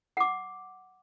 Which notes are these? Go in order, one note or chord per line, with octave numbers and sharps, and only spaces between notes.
F#5 D6